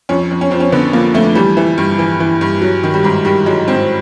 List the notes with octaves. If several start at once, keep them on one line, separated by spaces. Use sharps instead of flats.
F2 C#4
F2
C#4
F2 C4
C#4
D3 B3
F3 A#3
F2 A3
E3 G3
E3
G2
E3
E3
G2
F#3
D#3
G3
G#2
D#3 G3
F#3 G#3
G#2 C4